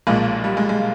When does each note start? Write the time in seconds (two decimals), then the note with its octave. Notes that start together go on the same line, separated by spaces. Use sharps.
0.07 B1 A#2 F3 G#3 A#3
0.44 G3
0.57 G#3
0.69 G#3